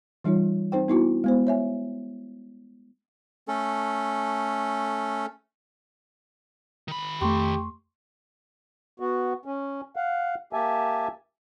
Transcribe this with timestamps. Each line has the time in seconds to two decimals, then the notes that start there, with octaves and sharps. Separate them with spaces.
0.24 E3 G3 D#4 F4 C#5
0.72 C4 D#4 C5 G5
0.88 B3 D#4 E4 F#4
1.24 G#3 B3 C5
1.47 C#5 E5 G#5
3.48 A3 C#4 A4
6.88 D#3 B5
7.21 F2 A3 G4 C6 C#6
9.00 B3 F#4
9.45 C#4
9.96 F5 F#5
10.53 A#3 G4 E5 G#5 A5